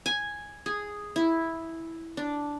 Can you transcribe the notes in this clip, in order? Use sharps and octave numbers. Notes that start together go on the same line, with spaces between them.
G#5
G#4
E4
D4